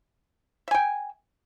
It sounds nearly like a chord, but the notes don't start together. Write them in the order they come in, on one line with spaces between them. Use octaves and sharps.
E5 G#5 G5